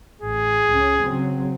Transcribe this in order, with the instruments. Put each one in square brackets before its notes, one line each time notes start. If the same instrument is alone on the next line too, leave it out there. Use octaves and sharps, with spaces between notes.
[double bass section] A1 [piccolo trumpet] G#4
[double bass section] C#2 C#4
C#3 F#3 C4